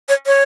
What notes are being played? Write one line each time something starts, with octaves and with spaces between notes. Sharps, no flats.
C#5
C#5